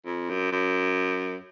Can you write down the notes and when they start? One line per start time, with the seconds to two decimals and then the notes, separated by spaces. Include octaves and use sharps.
0.06 F2
0.30 F#2
0.52 F#2